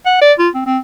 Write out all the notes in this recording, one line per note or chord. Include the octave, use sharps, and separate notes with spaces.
F#5
D5
F4
C4
C4